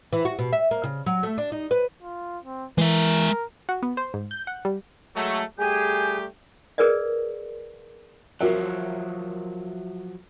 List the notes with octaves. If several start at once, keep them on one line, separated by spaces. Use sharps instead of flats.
E3
F#4
B2
E5
A#3
C#3
F#3
A3
D4
D#4
B4
F4
C4
E3 G#3 A#4 E5
F#4
B3
C5
G#2
G6
F#5
G3
F#3 G#3 A3
G3 A3 G4 G#4 G#5 G6
G#4 A#4 B4 D5 D#5
F3 F#3 F#4 A#4 E5